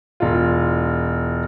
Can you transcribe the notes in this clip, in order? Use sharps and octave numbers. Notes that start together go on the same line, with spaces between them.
E1 F4